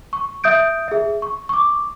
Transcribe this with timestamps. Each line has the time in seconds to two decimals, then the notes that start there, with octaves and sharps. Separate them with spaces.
0.13 C#6
0.44 E5 D#6 G6 D7
0.88 G#4 E5
1.22 C#6
1.49 C#6 D6